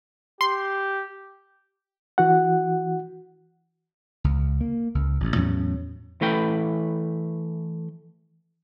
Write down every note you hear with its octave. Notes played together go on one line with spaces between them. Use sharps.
G4 C6
E3 F#4 F#5
C#2
A#3
C#2
A1
E2 A2 F#3 C#4
E3 A3 B4 G5